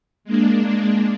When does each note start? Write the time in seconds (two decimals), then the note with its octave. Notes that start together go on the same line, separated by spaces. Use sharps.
0.24 G#3 A#3 D4